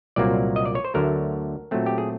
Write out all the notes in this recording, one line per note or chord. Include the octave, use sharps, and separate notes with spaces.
C2 A#2 F#3 A#3 D5
D#5
D5
C#5
C5
D2 D3 F#3 A3 A#4
A#2 F#3 A3 C4
G4
G#4